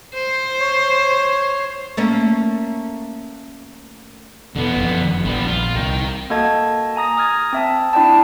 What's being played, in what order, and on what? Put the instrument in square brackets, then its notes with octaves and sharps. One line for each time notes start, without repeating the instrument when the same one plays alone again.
[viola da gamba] C5
[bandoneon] C#5
[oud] A3 A#3 C#4
[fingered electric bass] E2 B2 [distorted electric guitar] D3 B3
[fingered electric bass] F#1 F2
[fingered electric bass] A#1 [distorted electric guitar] G3 B3
[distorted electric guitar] F4
[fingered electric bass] C2 [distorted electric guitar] A#4 G5
[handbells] A#3 F#4 A4 D#5 A5 G#6
G#5 A#5 D#6 A#6
D#6 F6 G#6 A6
C4 E5 A5
D4 E4 D5 G5 A5